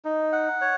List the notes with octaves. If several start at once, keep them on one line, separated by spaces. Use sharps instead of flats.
D#4
F#5
C#5